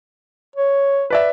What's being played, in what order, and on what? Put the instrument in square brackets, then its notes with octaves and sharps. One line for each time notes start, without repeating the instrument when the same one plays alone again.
[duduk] C#5
[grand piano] B4 D5 E5